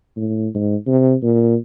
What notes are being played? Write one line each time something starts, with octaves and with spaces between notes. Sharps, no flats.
A2
G#2
C3
A#2